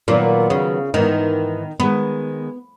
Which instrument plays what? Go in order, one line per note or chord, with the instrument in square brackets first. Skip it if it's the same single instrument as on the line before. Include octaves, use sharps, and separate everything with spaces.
[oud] A#2 [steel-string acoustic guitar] D#3 F#3 B3 F#4
[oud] C#3
[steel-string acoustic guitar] G#2 E3 B3 [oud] D#3
[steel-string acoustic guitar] D#3 G#3 [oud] B3